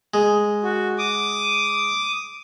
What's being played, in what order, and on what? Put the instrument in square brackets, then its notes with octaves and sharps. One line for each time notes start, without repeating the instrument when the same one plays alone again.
[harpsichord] G#3
[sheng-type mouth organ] F#4
D6 D#6